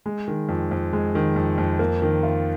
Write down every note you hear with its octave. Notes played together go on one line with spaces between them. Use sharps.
G#3
D#3
F2
F2
G#3
D#3
F2
F2
A#3
D#3
F4